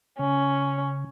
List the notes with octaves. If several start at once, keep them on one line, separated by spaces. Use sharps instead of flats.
C#3 C#4